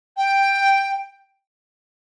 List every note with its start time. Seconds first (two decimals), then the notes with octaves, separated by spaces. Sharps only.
0.17 G5